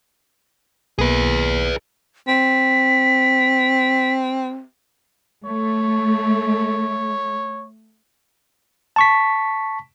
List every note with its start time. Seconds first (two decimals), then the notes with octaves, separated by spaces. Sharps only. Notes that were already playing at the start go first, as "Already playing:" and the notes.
0.99 B1 A#3 B3 G#4 B4
2.28 C4 B6
5.45 A3 C#5
8.96 A5 C#6 B6